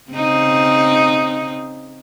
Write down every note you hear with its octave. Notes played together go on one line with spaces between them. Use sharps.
C#3 C4 D#4